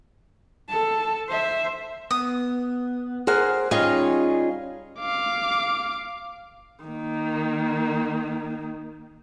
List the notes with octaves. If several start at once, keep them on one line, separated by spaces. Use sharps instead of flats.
A4 A5
C5 E5
B3 D#6
G#4 A#4 C5 F#5 F6
G3 C#4 D#4 F4 G#4 C#5 D#5 F6
F5 D6
D#3 A#3